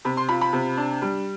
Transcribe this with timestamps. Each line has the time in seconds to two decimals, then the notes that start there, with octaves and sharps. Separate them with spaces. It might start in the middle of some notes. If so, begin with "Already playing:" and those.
0.05 C3 B5
0.17 C6
0.29 F4 B5
0.41 B5
0.53 C3
0.77 D4
1.02 G3